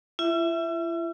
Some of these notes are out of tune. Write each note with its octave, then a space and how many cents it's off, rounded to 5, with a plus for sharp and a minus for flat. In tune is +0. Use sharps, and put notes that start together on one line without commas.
E4 +45 E5 +0